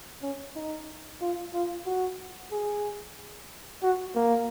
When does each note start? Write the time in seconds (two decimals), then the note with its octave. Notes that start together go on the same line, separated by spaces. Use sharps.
0.22 C#4
0.56 D#4
1.21 F4
1.53 F4
1.86 F#4
2.52 G#4
3.83 F#4
4.15 A#3